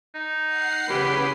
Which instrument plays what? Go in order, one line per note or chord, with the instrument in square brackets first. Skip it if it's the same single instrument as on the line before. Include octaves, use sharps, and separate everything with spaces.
[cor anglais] D#4
[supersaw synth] F#5 C7
[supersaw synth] C#3 [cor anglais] C#4 [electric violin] G4 [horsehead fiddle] B4